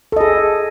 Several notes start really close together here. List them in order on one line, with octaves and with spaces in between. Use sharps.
A4 D#5 G#4